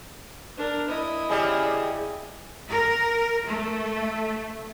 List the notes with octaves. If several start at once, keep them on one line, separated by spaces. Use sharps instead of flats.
D4 A#4
E4 D#5
C#3 G3 G#4
A#4
A3